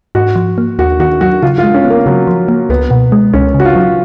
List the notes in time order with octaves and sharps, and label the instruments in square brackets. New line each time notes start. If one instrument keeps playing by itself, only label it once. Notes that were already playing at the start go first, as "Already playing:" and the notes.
[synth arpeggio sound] G#2 [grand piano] F#4
[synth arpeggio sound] F3
A#3
[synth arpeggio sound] D#2 [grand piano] F#4
[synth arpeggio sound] D#3 [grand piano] F#4
[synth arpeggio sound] F#3 [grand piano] F#4
[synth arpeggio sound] C#3 [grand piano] F4
[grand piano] F4
[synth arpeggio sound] G#3
[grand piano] C#4
[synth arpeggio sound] B3
[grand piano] A#3
[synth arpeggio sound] C#3 [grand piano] F#3
[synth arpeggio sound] F3
A#3
[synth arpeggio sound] C#2 [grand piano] B3
[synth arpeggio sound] B2
G#3
[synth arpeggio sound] C#2 [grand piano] C#4
[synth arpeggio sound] C#3
[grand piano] F#4
F4
[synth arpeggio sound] F#3